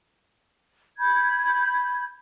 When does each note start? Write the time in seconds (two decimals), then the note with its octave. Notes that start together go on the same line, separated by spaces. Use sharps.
0.99 B5 G6 G#6